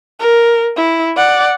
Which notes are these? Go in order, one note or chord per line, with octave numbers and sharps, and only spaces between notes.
A#4
E4
D5 F#5